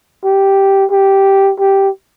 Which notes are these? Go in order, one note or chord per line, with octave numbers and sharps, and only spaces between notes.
G4
G4
G4